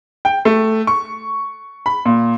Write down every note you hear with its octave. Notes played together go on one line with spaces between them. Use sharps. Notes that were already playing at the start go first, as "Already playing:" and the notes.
G5
A3
C#6
B5
A#2